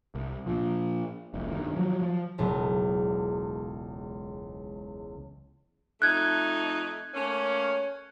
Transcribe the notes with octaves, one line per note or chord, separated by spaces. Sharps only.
C2
A#2 F3
F1 C2
G2 D#3
F3 F#3
F3
E1 C#2 F#3 B3
F2 A3 D#4 F#6 G#6
A3 A#3 C#4